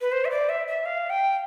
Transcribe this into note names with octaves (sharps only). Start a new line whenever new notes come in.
B4
C5
E5
D5
E5
E5
F5
G5